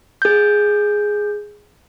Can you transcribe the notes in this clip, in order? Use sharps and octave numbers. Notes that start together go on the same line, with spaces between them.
G#4 G6